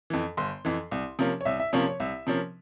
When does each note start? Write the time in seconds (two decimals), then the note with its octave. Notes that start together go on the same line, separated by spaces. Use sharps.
0.10 F2 E3
0.37 G1 C6
0.65 F2 E3
0.92 C2
1.19 C3 F3 A#3 C#4
1.41 C#5
1.45 C2 E5
1.60 E5
1.73 C3 F3 A#3 C#4 C#5
1.86 C#5
2.00 C2 E5
2.27 C3 F3 A#3 C#4